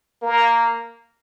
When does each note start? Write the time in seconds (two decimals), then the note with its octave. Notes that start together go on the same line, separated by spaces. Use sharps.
0.22 A#3